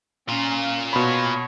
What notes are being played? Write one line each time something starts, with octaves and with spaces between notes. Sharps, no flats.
A#2 C#4 F4
B2 C#5 B5